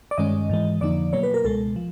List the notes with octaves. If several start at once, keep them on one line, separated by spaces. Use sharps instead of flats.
D5
G2 D#3 G#3 C#4 D#5
G#2 E3 G#3
F2 D3 F3 A#3 D#4 D5
B2 F#3 A#3 C#5
B4
A#4
C#2 B2 G#3 A4
F3